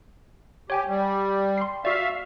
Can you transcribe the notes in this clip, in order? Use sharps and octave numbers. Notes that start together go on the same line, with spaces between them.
G4 C#5 G5 G#5
G3
C6 C7
F#4 D5 E5 F5